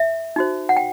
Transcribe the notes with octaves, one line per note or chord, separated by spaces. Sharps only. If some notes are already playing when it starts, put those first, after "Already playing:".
Already playing: E5
D#4 F#4 C5
F#5
G5